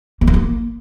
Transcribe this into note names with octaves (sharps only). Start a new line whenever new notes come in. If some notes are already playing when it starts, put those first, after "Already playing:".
A#3
D#3
A#3